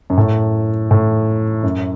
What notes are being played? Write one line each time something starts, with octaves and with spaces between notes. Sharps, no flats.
F#2
A2
A2
F#2